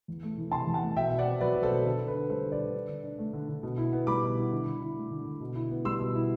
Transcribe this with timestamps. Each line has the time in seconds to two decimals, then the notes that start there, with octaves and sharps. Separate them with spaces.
0.08 E2
0.23 A3
0.38 E3
0.52 C3 A5 C6
0.67 E2
0.74 F#5 A5
0.82 A3
0.96 B2 E5 G5
1.12 B2
1.19 D5 F#5
1.26 C4
1.41 F#3 B4 D5
1.55 B2
1.63 A4 C5
1.71 B2
1.85 D3 A4
2.00 D3
2.08 B4
2.15 D4
2.30 G3 A4 C5
2.44 D3
2.52 B4 D5
2.60 D3
2.74 D3
2.89 D3
3.04 D4
3.19 A3
3.33 D3
3.49 D3
3.63 B2
3.78 E4
3.93 B3
4.07 G3 B5 D6
4.22 B2
4.37 E4
4.52 D3
4.66 D3
4.82 E4
4.96 A3
5.11 D3
5.26 D3
5.41 B2
5.55 E4
5.70 B3
5.85 G3 C6 E6
6.00 B2
6.15 E4